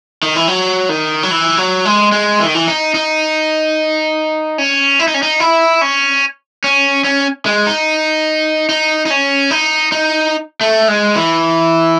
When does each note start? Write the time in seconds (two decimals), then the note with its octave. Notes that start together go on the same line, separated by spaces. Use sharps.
0.23 D#3
0.36 E3
0.48 F#3
0.89 D#3
1.23 F#3
1.31 E3
1.57 F#3
1.85 G#3
2.12 G#3
2.40 E3
2.47 D#3
2.55 E3
2.68 D#4
2.95 D#4
4.58 C#4
4.99 E4
5.08 D#4
5.14 C#4
5.23 D#4
5.40 E4
5.81 C#4
6.64 C#4
7.04 C#4
7.46 G#3
7.67 D#4
8.69 D#4
9.06 D#4
9.10 C#4
9.51 D#4
9.92 D#4
10.61 A3
10.88 G#3
11.16 E3